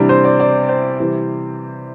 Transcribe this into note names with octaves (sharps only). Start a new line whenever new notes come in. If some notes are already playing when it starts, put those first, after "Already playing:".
Already playing: C3 E3 G3 D4
C5
D5
D5
C5
C3 E3 G3